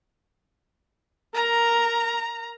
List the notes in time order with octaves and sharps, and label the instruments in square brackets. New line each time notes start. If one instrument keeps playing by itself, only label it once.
[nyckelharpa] A#4 [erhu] A#5